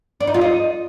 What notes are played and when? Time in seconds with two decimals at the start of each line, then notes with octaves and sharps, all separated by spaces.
0.21 D4
0.27 D#4
0.34 F4
0.41 D#5